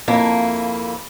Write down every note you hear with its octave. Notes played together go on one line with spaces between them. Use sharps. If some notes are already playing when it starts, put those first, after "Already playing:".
F2 A#3 E4